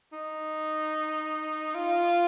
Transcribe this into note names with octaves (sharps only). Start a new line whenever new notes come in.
D#4
F4